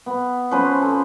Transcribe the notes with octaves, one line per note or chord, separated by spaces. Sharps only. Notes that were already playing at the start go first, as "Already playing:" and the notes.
B3
F3 C#4 B4 C5
A4